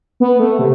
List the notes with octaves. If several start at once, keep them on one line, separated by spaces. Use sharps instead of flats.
B3
A3
C3